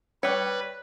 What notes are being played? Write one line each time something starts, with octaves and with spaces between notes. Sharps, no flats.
G3 B4 C#5